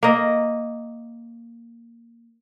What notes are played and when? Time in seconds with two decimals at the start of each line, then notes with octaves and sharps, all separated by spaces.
0.03 A#3 D#5